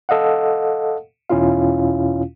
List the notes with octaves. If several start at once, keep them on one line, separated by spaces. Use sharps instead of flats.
A4 D#5 F5 F#5
E2 B2 C#4 E4 F4 F5